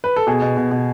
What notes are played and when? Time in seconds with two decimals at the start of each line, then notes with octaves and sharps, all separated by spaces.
0.04 B4
0.16 A4
0.27 B2 G#4
0.42 B2
0.57 B2
0.71 B2